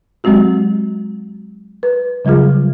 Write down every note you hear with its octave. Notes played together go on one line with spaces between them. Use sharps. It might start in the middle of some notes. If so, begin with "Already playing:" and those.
F#3 G#3 C4 F#4 G4
B4
C#3 F#3 G3 F4 G#4